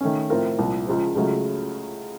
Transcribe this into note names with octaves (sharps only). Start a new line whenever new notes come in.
D#3 A3 C#4
A2 F3 C4 F4 A#4
C2 A#2 F3
C#2 C#3 F3
C#2 C#3 F#3 A3